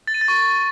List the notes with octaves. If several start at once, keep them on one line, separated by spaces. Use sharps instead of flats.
A6
D#7
A6
C#6